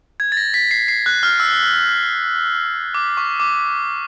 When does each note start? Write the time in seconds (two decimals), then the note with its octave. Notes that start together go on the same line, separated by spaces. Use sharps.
0.20 G#6
0.32 A6
0.37 A#6
0.54 B6
0.71 C7
0.88 C7
1.06 F#6
1.23 F6
1.40 E6
2.94 D6
3.17 C#6
3.40 D6